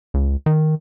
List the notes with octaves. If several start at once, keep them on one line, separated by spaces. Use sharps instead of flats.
C#2
D#3